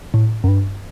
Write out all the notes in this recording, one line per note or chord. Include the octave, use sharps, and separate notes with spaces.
A2
F#2
G2